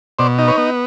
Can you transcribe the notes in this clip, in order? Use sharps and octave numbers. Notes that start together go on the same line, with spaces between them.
B2 C5 D5
D#4
B4 C#5
B3